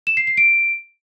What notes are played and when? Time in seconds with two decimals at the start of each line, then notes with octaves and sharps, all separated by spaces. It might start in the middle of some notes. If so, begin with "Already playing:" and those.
0.07 E7
0.17 C7
0.27 C7
0.37 D7